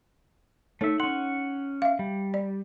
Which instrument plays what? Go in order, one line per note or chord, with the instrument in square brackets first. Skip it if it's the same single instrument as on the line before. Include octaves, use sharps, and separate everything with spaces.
[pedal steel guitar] A3 E5 [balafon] D#4 A4 C#5
[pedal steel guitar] C#4 F#5 [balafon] C6
[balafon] E5 F5
[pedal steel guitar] G3
[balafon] D5